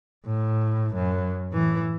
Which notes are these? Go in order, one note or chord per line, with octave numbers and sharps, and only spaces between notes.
A2
F#2
A2 E3